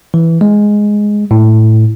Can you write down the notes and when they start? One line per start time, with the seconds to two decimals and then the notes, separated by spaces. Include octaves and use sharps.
0.14 E3
0.41 G#3
1.31 A2